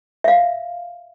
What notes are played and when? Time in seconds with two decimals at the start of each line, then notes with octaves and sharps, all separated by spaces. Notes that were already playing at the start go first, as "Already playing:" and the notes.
0.24 E5 F5